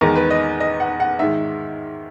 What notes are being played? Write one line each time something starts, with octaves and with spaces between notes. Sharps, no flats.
E2 D#3 G#3 A#4
B4
D#5
D#5
F#5
F#5
G#2 D#3 G#3 E5